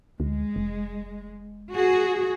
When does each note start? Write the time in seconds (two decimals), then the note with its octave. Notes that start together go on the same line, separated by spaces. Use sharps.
0.20 D2 G#3
0.56 F1
1.72 F#4 G#4